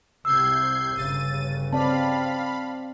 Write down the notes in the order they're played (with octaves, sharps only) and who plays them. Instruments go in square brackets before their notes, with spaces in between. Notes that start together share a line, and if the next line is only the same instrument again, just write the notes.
[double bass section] C2 C3 [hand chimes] E6 [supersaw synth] G6 G#6 C7
[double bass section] G1 C#3 [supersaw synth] A6 D#7
[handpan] C4 D5 [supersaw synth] F5 B5 [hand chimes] A5